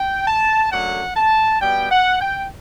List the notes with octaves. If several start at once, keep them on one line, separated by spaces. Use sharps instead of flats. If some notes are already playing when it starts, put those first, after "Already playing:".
Already playing: G5
A5
F#2 D3 F#3 A3 F#5
A5
B2 G3 B3 G5
F#5
G5